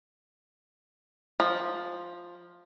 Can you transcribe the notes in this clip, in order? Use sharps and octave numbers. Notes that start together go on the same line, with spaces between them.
F3